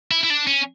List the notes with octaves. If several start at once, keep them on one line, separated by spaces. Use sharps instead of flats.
E4
E4
D4
C#4